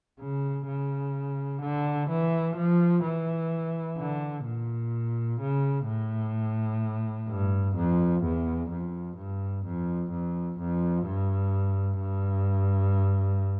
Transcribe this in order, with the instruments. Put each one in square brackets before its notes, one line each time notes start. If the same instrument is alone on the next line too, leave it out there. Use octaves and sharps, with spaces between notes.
[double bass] C#3
C#3
D3
E3
F3
E3
D3
A#2
C#3
A2
G2
F2
E2
F2
G2
F2
F2
F2
G2
G2